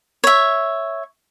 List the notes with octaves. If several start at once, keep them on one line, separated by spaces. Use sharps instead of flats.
C#5 E5